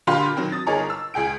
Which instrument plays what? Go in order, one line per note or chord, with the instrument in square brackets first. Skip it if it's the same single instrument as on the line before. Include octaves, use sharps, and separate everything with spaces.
[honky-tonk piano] A#2 D3 F4 G4 B5 C6
D#3 F#3 C4
D#6 A6
G1 D#4 G#4 A#4 C#5 A#5
E6
C#2 G#4 G5 D7